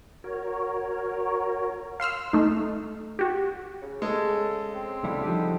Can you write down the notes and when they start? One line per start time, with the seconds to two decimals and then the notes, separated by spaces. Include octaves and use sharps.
0.24 F#4 A#4 C#5
2.00 F5 C6 E6 F6
2.33 A3 D#4
3.19 F#4 G4
3.82 C#3
4.02 G#3 A4
4.74 C4
5.04 C#2 D3 G3 E4
5.24 F3 D#4 G4